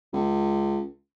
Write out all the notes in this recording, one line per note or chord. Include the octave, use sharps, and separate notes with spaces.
C#2